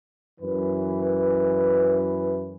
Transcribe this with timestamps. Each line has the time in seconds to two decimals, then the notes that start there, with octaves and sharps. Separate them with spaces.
0.40 F#2 E3 B4